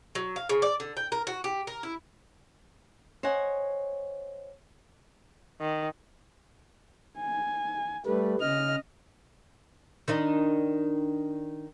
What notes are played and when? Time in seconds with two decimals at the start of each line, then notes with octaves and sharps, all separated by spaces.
0.15 F#3
0.36 F5
0.49 C#3
0.62 D5
0.80 D3
0.97 G5
1.12 A#4
1.27 F#4
1.44 G4
1.67 A#4
1.83 E4
3.23 C5 C#5 D#5 F#5 G#5
5.61 D#3
7.20 G#5
8.06 G3 A3 B4
8.41 C#3 D#5 F6
10.08 D#3 D4 D#4